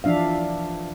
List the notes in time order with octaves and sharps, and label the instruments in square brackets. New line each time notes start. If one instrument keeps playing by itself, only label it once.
[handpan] E3 F3 D4 E5 F5